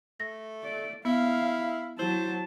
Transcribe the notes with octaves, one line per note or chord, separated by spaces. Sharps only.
A3 A#6
D5
B3 E4 F5
F#3 E4 C5 A5